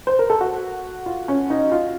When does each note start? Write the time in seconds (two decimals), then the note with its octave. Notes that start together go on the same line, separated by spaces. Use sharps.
0.07 C5
0.19 A#4
0.30 A4
0.41 F#4
1.06 F4
1.28 C#4
1.50 D#4
1.72 F4